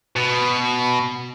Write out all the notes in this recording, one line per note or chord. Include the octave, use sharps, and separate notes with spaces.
B2